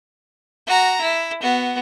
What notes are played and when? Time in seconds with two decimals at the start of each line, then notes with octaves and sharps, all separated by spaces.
0.67 F#4 A#5
1.01 E4
1.42 B3 F#4